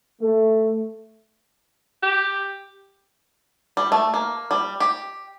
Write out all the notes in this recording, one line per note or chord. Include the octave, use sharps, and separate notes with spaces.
A3
G4
G3
A3
A#3
G3
G4